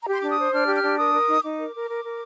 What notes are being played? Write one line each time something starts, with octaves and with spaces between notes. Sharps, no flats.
A#5
G4 C6
D4 D6
D#6
C5
D4 F6
G4
F6
D4
A#4 D#6
A#4
D#4
D#4 D6
A#4
A#4
A#4
A#4